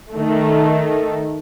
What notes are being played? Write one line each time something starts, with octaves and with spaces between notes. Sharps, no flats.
D#3 A3